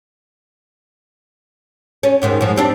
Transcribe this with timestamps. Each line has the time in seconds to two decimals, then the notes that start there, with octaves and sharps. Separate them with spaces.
2.03 C#4
2.22 D#2 G#2 D#3
2.41 G#2 F3
2.56 G3 C4 D4